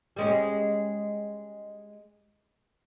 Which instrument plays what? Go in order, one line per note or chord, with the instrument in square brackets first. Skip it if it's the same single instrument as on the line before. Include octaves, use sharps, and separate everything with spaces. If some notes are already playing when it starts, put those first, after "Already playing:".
[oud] G3 G#3 C#4